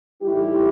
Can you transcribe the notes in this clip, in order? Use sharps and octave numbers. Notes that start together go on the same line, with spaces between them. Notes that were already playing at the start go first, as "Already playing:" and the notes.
A2 E3 G3 D#4 E4 G4